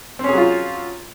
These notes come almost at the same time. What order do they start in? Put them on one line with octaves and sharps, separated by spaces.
C4 C#4 G#4 F#3 F4